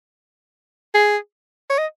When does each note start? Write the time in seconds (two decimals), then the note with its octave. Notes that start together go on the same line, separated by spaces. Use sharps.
0.94 G#4
1.70 C#5
1.78 D#5